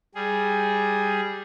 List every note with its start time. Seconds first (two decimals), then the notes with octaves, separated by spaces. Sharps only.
0.15 G3 G#4